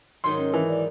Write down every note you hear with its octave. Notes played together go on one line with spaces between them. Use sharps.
G#2 D#3 F#3 C6
C#4
E3
D5